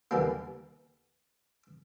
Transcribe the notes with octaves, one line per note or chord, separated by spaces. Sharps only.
D#2 D3 E3 G3 A#3